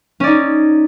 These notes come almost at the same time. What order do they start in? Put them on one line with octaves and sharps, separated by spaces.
C#4 D5 D#4